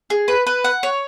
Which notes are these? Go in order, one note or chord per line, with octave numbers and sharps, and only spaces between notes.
G#4
B4
B4
F#5
C#5